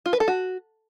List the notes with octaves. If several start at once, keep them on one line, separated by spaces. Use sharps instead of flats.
F4
B4
A4
F#4